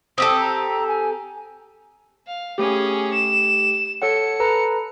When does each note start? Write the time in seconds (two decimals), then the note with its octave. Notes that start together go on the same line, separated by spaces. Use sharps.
0.18 C4 G4 A4 D#6
0.40 A#5
0.88 G#5
2.27 F5
2.58 A3 C#4 G4 G#4
3.13 E7
4.02 A4 C#5 F#5 C#7
4.40 A4 B4 A#5